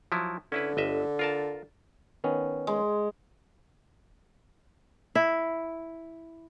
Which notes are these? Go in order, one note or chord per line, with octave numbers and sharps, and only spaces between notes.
F3 F#3 E4
D3 C#4 E4 B4
G1 D#5 E5
F4 A#4 A5
D#3 B3 C#4
G#3
E4